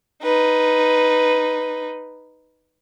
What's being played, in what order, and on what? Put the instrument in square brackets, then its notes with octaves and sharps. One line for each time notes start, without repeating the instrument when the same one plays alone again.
[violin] D#4 B4